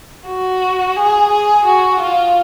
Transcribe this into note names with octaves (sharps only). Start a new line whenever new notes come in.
F#4
G#4
G#4
F#4
F4